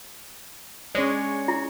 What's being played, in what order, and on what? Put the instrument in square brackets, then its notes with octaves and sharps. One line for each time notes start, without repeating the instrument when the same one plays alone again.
[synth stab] G#3 [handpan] C#4 C#5 D5
[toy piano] E4